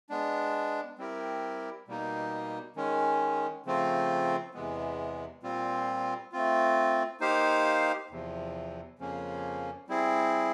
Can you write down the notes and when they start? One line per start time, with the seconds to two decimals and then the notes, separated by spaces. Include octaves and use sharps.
0.10 G#3 B3 D4
0.98 G3 C4 E4 G4 A#4
1.88 B2 G3 A#3 D#4
2.76 D#3 G#3 C#4
3.66 C#3 F3 A3 C4 F4
4.54 E2 C3 E3 G#3 B3
5.43 A#2 G3 C4 F4
6.32 A3 C4 F4
7.20 A#3 D#4 G4 C5 F5
8.10 E2 C3 F3
8.99 F2 C#3 F3 A#3 C#4
9.88 G3 C4 E4 G#4